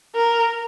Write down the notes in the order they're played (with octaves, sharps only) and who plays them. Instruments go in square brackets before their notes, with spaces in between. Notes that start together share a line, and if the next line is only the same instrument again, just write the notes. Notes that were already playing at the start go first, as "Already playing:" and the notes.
[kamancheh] A#4